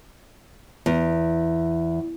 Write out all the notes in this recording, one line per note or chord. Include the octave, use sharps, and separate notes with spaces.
E2